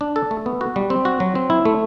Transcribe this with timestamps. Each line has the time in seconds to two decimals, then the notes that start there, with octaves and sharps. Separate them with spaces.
0.01 D4
0.16 A4
0.31 A3
0.46 B3
0.61 F#4
0.76 G3
0.90 C4
1.05 F#4
1.20 F#3
1.35 C4
1.50 E4
1.65 A3